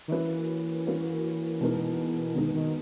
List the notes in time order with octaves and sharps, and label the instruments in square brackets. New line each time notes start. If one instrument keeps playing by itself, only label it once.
[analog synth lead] D#3
[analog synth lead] E3 [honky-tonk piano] A#3 C#4 F#4 B4
[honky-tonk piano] A#3 C#4 F#4 B4
B2 G#3 B3 D#4 A#4
[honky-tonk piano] B2 G#3 B3 D#4 A#4 [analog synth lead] D#3
[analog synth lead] D#3